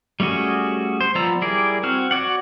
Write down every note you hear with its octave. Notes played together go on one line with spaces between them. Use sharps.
G3 A3 C#4 F#4 G#4
C5
F3 B3 D5 A#5 E6
G3 E4 G#4 A#4 D5
C4 F#4 F6
F#4 C#5 D5 F#5